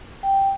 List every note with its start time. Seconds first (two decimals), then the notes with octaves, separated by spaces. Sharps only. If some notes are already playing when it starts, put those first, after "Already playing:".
0.23 G5